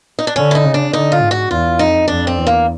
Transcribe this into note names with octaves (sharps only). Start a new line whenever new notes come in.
D#4
D4
D3 C#4
E4
D#4
C#3
D4
D3 D#4
F4
G#2
F#4
E2 F4
F2 D#4
F2 D4
C4
E2
A#3